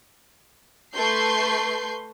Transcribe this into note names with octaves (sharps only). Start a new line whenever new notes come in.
A3 B4 C6 C#6 G6 C7